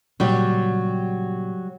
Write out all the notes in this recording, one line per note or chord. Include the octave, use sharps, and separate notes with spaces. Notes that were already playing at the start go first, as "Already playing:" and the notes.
A#2 C#3 F#3 G3 G4